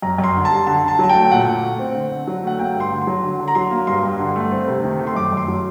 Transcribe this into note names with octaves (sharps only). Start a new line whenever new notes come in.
F#2 A#5
F#2
C6
D3
A5
G3
D3 A5
D3 A5
F#3 A5
G5
A3
A#2 F#5
A#2
A3
C4
D3
D3
F#3
A3 F#5
A#3 G5
G2
C6
D3
C6
F#3
D3
D3
A#5
F#3 C6
A#3
G2 C6
G2
D3
A3
C4
C3
D#3
A3
C6
F#2 D6
F#2 C6
F#3